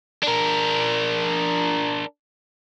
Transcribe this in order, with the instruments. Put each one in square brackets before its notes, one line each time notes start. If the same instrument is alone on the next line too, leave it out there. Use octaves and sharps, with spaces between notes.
[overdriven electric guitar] D4 A#4